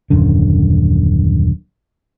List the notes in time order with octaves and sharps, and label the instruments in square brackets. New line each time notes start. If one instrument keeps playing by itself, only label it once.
[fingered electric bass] D#1 F#2 D3